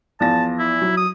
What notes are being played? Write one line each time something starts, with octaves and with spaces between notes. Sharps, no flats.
E2 F3 A5 A#6
E4
F#3
D#6